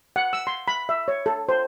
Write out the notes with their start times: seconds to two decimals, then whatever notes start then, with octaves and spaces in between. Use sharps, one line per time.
0.16 F#5
0.33 E6
0.47 C6
0.68 B5
0.89 E5
1.08 C#5
1.26 A4
1.49 C5